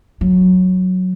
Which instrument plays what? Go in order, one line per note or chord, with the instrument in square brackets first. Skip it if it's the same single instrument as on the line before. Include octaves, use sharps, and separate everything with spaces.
[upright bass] F#3